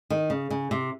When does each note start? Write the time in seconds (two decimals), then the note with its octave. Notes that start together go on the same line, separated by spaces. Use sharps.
0.10 D#3
0.30 C#3
0.50 C#3
0.71 C3